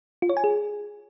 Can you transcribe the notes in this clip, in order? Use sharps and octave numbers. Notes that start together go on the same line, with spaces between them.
F4
C#5
G#5
G#4